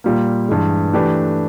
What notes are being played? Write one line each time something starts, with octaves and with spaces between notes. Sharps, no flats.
A#2 G3 A#3
G2 E3 G#3
E3 A3 D4 G4 B4